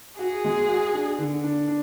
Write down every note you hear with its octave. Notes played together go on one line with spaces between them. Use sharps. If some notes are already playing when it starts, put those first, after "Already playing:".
F#4 G#4
G#3
F#4
D4
D3
D4
D4